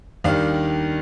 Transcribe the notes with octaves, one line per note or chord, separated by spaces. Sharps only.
D#2 D#3 G3 D4 F5